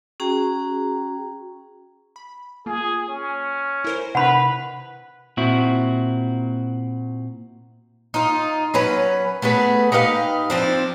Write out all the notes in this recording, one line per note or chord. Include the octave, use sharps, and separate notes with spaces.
C#4 F#4 G#4 G5 A#5
B5
A#3 F4 G#4
C#4
E4 A#4 C5
C3 B4 F#5 B5
A#2 C4 E4 F#4
D#4 F4
F#3 C#4 B4
A3 B3 G#4 B4
D#4 G4 B4 F5
F3 C4 D4